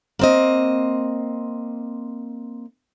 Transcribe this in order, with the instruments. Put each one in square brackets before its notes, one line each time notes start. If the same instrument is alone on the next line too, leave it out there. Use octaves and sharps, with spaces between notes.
[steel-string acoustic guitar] A#3 C4 D#5